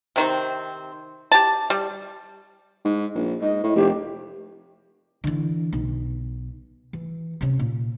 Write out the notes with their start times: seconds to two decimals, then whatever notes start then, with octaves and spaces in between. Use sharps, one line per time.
0.16 C3 D#3 C4
1.32 G4 A5
1.70 G3
2.85 G#2
3.15 A#1
3.41 G#2 D#5
3.63 A2
3.75 F1 G4
5.24 D3 E3
5.73 B1
6.93 E3
7.41 C3 C#4
7.59 A#2